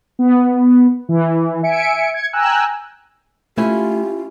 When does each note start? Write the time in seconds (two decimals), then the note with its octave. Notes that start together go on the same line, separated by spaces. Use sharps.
0.19 B3
1.09 E3
1.63 E5 G#5 C#7 D7
2.14 G#6 C#7
2.33 G5 G#5 A#5 E6 F#6
3.58 A3 C#4 E4 F4 G4